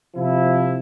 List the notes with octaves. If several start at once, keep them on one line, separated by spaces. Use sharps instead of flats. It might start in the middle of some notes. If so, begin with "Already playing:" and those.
C3 F3 E4